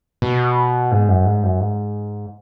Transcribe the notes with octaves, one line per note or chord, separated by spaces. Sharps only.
B2
G#2
F#2
G#2
F#2
G#2